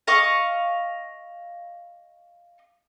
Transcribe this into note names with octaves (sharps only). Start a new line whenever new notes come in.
D#5 F5 C#6